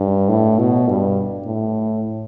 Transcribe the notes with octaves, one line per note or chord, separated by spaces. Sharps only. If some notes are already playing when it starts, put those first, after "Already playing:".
Already playing: G2
A2
B2
G2
A2